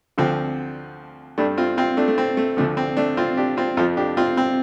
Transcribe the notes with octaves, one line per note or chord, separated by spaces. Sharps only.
D2 D3 F3 C4
G2 G3 A3 D4
C4 F4
C4 F4
A3 D4
A3
C4
A3
D2 D3 F3 A3
C4
A3 D4
C4 F4
D4 G4
C4 F4
F2 F3 F4 A4
D4 G4
C4 F4
C4